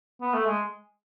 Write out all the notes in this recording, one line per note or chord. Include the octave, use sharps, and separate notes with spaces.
B3
A3
G#3